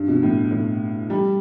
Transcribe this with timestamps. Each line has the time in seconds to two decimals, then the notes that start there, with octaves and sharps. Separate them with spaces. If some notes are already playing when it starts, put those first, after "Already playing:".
Already playing: G2
0.08 B2
0.23 A2
0.51 A2
1.10 G3